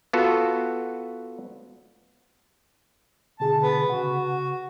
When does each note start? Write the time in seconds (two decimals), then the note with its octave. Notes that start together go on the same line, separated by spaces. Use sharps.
0.13 B3 F4 F#4 A4
3.40 B2 D3 G#4 A5
3.62 B3
3.87 C#3 F#4 F#5